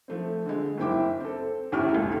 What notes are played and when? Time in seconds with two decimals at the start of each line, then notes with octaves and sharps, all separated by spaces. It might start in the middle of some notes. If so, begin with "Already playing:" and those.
0.08 F3 A3 C4
0.46 D3 G#3
0.78 F#1 D#2 C4 E4 G5 D6
1.20 C4 A4
1.72 A1 E2 A2 C#3 G4 F6
1.94 F1 C#2 G#2 A3 F4